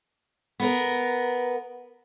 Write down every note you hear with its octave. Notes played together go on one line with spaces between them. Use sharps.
B3 A#4